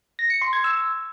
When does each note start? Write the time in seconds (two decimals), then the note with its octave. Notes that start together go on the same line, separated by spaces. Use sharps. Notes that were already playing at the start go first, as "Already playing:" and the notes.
0.19 A#6
0.30 C#7
0.42 C6
0.53 G#6
0.64 E6